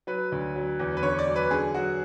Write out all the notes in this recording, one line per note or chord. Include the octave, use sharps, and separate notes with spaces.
F#3 B4
D2
F#3
E2
B4
D3 C#5
D5
F#3
B4
D3 G#4
F#3 F#4